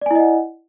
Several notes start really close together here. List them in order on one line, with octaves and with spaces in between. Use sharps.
D5 G#5 E4 D#5 F#5